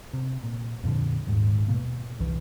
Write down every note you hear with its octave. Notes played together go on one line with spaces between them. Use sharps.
C3
A#2
F2 A#2 D3
D#1 D#2 G#2
B2 A#3 B3
G1 C2 E3